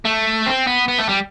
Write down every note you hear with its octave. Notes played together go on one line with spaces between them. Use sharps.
A3
C4
B3
B3
A3
G3